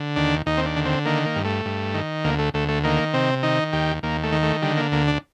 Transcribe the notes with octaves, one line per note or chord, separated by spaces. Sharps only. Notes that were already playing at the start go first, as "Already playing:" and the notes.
Already playing: D3
D#2 D4
D#2 D#4
C4
D4
D3
C4
D#3 A#3
A#3
G2
A3
G2
D#3
D2 A#3
A3
D2 A3
A3
D#3 A#3
C3 C4
D#3 D#4
D#2 G4
D#2 A#3
A3
D#3
A3
D3 G3
A#3
D2 A#3
D4